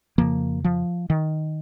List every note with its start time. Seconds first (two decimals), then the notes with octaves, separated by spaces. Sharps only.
0.18 F2 C#3 F3 A#3
0.64 F3
1.10 D#3